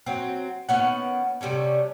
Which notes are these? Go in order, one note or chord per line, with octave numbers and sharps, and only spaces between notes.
F#3 C4
D#3 B3 C#4 F#5
C3 G3 A3 C#4